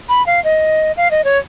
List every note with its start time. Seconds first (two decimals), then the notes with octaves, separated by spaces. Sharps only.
0.09 B5
0.26 F5
0.44 D#5
0.97 F5
1.11 D#5
1.24 C#5